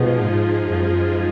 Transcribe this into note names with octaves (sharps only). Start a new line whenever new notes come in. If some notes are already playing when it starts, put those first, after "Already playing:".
Already playing: B2 F3 G#3 D#4 G#4
G#2
F#2